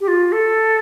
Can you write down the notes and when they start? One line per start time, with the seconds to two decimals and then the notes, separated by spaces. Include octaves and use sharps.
0.01 G4
0.08 F4
0.32 A4